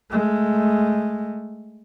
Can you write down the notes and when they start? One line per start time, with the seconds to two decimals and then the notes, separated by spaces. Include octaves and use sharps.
0.11 G#3 A3